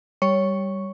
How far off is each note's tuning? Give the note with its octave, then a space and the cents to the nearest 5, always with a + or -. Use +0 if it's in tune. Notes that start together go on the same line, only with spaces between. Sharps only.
G3 +0 C#5 +5 C#6 +0